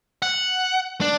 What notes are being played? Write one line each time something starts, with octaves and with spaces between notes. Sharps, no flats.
F#5
D4